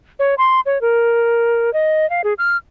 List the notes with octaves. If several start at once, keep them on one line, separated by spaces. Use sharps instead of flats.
C#5
C6
C#5
A#4
D#5
F5
G#4
F6